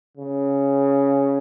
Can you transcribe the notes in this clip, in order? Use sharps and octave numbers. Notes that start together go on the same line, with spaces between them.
C#3